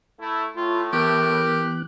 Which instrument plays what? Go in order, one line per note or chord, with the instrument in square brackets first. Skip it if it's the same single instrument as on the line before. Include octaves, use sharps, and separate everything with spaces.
[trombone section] A3 E4
[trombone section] A2 A3 [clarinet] F4
[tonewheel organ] E3 B3 F#6 [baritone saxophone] G4 [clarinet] A#4